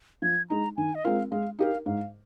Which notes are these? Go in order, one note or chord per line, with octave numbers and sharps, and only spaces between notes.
F3 G#6
G#3 D#4 A#5
D#3 G#5
D#5
G#3 C4 F4 A#4 F5
G#3 F5
D#4 G4 A#4 F5
G#2 F5